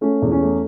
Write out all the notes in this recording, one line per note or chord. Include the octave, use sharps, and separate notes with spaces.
A3 C#4
E2
C#4
A3